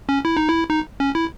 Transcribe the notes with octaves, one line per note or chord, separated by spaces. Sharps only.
C#4
E4
D#4
E4
D#4
C#4
E4